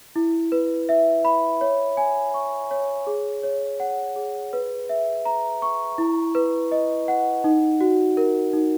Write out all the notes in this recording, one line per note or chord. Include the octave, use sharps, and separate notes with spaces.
E4
B4
E5
B5
C#5
G#5
C#6
C#5
G#4
C#5
F#5
G#4
B4
E5
A#5
C#6
E4
B4
D#5
F#5
D#4
F#4
A#4
D#4